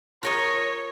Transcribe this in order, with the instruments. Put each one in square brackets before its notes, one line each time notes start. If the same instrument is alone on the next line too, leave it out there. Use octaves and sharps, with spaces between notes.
[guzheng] F4 A#4 D#5 [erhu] C#5